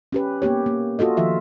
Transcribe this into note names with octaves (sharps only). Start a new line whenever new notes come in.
C#4 G4 B4
A#3 B3 G4 C#5
A#3
F4 F#4 A4 D#5
D#3 F3 F4 E5